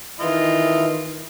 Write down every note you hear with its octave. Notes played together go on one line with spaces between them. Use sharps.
D#3 E3 E4 F4 D#5